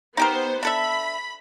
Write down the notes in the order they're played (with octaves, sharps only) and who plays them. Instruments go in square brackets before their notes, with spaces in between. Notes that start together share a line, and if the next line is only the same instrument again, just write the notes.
[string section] B3 C5 [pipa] D#4 G4 A#4
[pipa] D4 A4 E5 [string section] B5